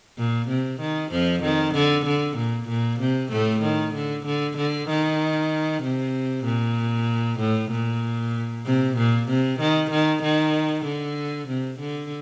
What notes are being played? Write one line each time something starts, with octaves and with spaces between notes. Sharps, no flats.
A#2
C3
D#3
F2 F3
D#3
D3
D3
A#2
A#2
C3
A2 A3
D#3
D3
D3
D3
D#3
C3
A#2
A2
A#2
C3
A#2
C3
D#3
D#3
D#3
D3
C3
D3